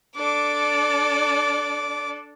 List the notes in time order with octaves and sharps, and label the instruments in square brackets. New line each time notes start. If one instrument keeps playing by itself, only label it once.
[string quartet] D4 A4 D5 [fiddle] D6